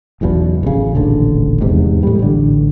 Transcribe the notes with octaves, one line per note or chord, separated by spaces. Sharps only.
F#1 B1 E2 B2
A1 C#3
D#1 A1 D3
E2 G#2 C3
A2 G3
A1 D3